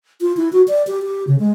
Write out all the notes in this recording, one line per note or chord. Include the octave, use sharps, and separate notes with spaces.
F4
E4
F#4
D5
G4
G4
C#3
G#3